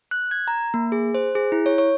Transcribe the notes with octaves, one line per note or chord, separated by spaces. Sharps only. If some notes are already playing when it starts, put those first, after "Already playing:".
F#6
G#6
A#5
A#3
G#4
C5
G#4
E4
C#5
C#5